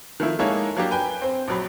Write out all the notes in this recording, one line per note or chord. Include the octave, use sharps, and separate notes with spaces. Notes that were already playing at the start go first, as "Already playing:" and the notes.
D#3 F3 A3 E4
G#3 A#3 D#4 E4 A4 C#5
F#3 A#3 D4 G4
B4 G5 G#5
C4 C5
A#1 F#3 B5